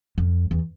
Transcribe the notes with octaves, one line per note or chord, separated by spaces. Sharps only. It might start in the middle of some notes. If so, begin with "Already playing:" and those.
F2
E2